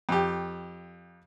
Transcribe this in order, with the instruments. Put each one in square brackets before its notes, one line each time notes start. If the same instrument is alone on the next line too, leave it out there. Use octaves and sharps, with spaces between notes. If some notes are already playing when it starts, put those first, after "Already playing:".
[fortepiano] F2 G4